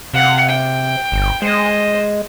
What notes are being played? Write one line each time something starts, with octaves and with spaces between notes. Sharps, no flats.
C3 F5 F#5
G5
G1
G#3 C5 D#5